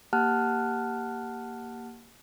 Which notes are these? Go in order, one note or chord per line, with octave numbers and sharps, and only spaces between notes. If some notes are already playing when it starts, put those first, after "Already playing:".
A#3 G4 F#5 A5 F6 F#6